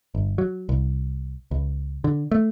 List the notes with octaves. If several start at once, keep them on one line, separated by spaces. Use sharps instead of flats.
G1
F#3
C2
C#2
D3
A3